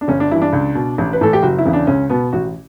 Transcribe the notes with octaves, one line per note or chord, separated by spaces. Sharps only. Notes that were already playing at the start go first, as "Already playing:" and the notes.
D4
G1 C#4
D4
G2 E3 E4
D4
C#2
B2
A1
B4
A2 E3 A4
G4
F#1 F#4
E4
E2 C#3 E3
D4
C#2 C#4
B2 B3
A1 F#4